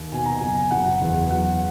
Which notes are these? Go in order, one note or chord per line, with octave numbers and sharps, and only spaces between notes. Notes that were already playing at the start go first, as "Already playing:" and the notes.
Already playing: D#2
B2 G#5
A#5
F#1 G#5
F#1 F#5
E2
F#3 F#5